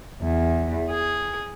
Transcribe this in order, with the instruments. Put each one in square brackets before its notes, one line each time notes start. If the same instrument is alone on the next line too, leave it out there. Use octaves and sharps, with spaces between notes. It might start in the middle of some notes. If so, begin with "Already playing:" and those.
[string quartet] E2
G#4